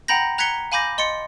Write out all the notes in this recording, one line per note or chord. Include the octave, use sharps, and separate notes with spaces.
F#5 G5 A#5 B5 G6 A#6
A#5 F#6 G#6 B6 C#7 G7
F5 G#5 B5 D6 G6 A#6
D#5 C6 A6 C#7